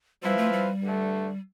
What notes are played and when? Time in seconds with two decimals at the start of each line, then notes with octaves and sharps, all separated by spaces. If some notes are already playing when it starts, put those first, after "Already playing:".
0.23 F3 G3 C4 E4 B4 F5
0.37 A3
0.52 G3
0.82 G2 D3 A3